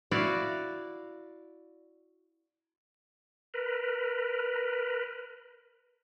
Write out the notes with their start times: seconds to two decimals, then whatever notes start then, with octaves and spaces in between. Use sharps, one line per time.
0.11 E4 F#4 D5 F5
3.54 A#4 B4